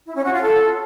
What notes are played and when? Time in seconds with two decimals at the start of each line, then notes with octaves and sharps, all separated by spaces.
0.06 E4
0.15 C#4
0.24 F#4
0.33 F4
0.42 A4